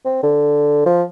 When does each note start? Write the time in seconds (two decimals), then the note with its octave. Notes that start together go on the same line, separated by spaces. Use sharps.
0.05 C4
0.23 D3
0.86 F3